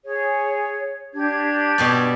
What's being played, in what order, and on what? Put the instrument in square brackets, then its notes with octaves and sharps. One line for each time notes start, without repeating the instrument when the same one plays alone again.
[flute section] G#4 C#5
D4 G4 G#6
[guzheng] B2 G3 D5